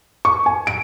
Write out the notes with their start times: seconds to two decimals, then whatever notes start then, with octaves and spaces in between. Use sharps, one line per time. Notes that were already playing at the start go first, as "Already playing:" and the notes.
0.25 C#6
0.46 G#5
0.67 D7